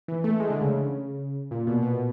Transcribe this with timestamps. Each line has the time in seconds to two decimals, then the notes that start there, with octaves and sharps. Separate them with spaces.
0.08 E3
0.24 A3
0.40 G#3
0.50 D3
0.61 C#3
1.51 A#2
1.67 B2
1.83 B2